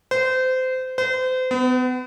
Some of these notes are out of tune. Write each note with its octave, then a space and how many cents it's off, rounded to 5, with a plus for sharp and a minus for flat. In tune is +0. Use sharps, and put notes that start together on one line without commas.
C5 -25
C5 -35
B3 +35